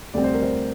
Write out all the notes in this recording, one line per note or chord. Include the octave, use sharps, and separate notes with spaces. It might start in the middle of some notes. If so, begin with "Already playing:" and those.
D2 C3 G3 C4 D5
C5
A#4
C5